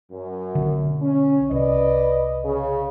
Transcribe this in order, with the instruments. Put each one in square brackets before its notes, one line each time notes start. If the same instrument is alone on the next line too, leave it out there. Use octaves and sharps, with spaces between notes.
[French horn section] F#2
[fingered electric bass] B1 D3
[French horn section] C#4
[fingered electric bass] C2 [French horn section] B4 D5 D#5
[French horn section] C#3